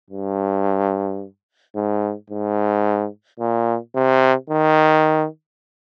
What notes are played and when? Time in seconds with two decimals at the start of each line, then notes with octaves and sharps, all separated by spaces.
0.10 G2
1.75 G#2
2.30 G#2
3.40 A#2
3.95 C3
4.50 D#3